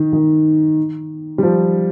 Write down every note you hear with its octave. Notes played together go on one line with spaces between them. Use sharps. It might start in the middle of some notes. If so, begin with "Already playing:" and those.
Already playing: D#3
D#3
G3
F3